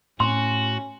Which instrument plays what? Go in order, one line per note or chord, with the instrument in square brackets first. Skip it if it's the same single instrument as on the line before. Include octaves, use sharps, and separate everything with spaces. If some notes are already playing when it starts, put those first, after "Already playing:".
[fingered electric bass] A2 [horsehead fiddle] C#4 [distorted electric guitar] F#4 [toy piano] C6